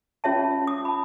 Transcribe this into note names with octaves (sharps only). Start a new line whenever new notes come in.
C#4 F4 C#5 E5 A5
D#6
A5 B5